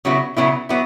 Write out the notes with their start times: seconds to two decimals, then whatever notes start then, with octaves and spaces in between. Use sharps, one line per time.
0.05 C#3 F#3 B3 E4
0.37 C#3 F#3 B3 E4
0.69 F#3 B3 E4